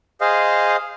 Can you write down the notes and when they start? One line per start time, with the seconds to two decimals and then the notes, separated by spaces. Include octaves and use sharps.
0.21 G#4 C5 D#5 F5